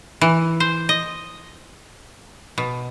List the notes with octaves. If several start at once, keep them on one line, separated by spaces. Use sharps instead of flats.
E3
C5
D#5
B2